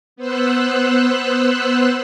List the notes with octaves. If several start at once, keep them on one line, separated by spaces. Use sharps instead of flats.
B3 C5 E6 F#6